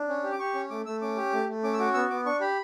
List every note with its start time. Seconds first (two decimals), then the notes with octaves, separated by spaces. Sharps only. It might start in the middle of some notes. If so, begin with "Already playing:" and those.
Already playing: D4
0.09 C#4
0.24 G4
0.32 D6
0.39 G4 C#6
0.55 C#4
0.70 A3 D6
0.86 A3 E6
1.02 C#4 D6
1.17 G4
1.33 A3
1.49 A3
1.64 C#4 D6
1.74 E6
1.79 F#4 D6
1.94 B3 E6
2.10 B3 D6
2.26 D4 C#6
2.41 G4 B5